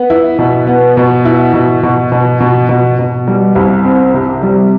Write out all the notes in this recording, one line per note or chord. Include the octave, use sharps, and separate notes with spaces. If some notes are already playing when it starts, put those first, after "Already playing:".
Already playing: B3
E4
B2
B3
B2
E4
B2
B2
B2
B2
B2
B2
G3
C2
C4
C3
G3